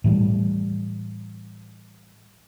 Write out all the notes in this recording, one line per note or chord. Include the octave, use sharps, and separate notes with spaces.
A2 E3 G3